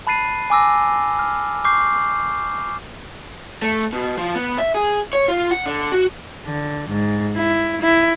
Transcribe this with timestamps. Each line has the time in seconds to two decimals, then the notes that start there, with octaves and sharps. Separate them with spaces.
0.07 A5 B5 F#6 A6 C7 D#7
0.50 G#5 D6 E6 A#6
1.19 F6
1.64 C#6 D6 F6 G6 C7
3.62 A3
3.93 B2
4.17 F3
4.35 B3
4.58 E5
4.74 G#4
5.13 C#5
5.28 F4
5.51 F#5
5.66 D3
5.92 F#4
6.46 D3
6.89 G#2
7.36 E4
7.81 E4